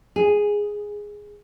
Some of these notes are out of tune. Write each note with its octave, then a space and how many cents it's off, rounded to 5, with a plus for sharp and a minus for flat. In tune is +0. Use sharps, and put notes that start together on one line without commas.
G#4 -5